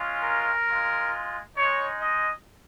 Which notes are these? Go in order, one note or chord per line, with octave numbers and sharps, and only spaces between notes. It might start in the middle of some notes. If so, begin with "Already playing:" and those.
Already playing: G#3 C#4 F4
A#4
G#3 F4
G#3 D#4 C#5
D#5